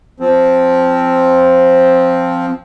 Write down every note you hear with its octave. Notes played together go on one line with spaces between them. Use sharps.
F3 C4